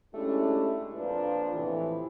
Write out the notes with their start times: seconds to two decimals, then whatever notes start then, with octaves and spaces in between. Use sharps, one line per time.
0.14 G#3 A3 C#4 D4 E4 G4
0.94 F2 A#2 F3 D4 B4
1.54 F2 A2 C3 E3